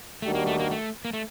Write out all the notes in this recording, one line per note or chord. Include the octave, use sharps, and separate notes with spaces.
D#2 D#3 G3 A3 D4 F#4
A#3
A3
A#3
A3
A#3
A3